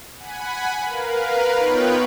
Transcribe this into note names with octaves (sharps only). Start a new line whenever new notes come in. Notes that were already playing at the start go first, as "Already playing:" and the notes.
F#5 G#5 B5
A#4 B4 F5
B3 D#4 F4 B4 C#5 G5